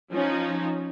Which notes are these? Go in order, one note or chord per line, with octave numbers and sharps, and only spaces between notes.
F3 C#4 D#4